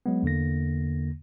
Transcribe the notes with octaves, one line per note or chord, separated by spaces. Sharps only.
F#3 G#3 B3
E2 D3 A#3 A#6